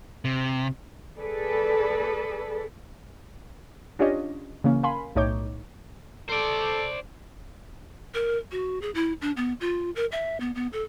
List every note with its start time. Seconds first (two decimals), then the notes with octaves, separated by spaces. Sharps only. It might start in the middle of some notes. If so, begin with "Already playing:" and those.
0.25 C3
1.19 G#4 A4 B4 D5
3.99 C#4 D4 F4 G4 C#5 D#5
4.64 C#3 E3 A#3 C#4
4.83 A#4 F5 G#5 B5 C6
5.15 B1 A2 D#4 C#5 D6 G6
6.30 A4 C5 D5
8.14 A#4
8.52 F#4
8.82 G#4
8.95 E4
9.22 D4
9.37 B3
9.61 F4
9.96 A#4
10.12 E5
10.40 B3
10.55 B3
10.73 A4